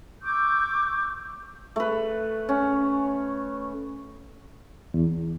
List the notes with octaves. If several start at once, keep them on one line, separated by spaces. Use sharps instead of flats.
C#6 D6 E6 G6
A3 B4
C#4
E2